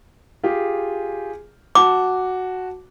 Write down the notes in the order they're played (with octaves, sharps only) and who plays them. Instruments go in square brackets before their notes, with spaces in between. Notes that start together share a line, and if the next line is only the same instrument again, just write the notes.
[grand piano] F4 G4 G#4
[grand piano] F#4 A5 [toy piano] D6